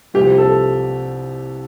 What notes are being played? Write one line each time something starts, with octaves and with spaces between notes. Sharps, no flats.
C2 C3 F3 G4
A4